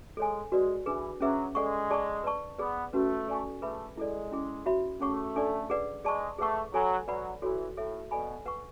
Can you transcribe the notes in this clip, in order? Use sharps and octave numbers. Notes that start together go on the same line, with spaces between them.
G#3 A4 C#5 G#5
G#3 F#4 B4 D5
E3 D4 G#4 B4
F#3 C#4 G#4 B4 E5
G#3 A4 D5 F#5 C#6
G#4 D5 A5 C#6
B4 D5 A5 C#6
B3 G#4 B4 D5
A3 C#4 F#4 B4
A4 D5 G#5 C#6
A3 G#4 B4 E5 B5
G#3 E4 A4 D5
C#4 E4 G#4
F#4 C#5 E5 B5
A3 C#4 G#4 C#5 F#5 C#6
D4 A4 D5
G#4 B4 D5 F#5
G#3 G#4 D5 A5 C#6
A3 G#4 B4 F#5 C#6
F#3 A4 C#5 G#5 B5
F#3 B4 D5 F#5 B5
E3 F#4 A4 C#5
A2 A4 C#5 E5
B2 A4 D5 G#5 B5
B4 F#5 C#6